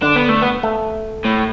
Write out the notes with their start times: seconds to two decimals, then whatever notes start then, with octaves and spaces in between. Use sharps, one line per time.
0.02 D3 D4
0.16 B3
0.29 A3
0.43 B3
0.63 A3
1.25 A2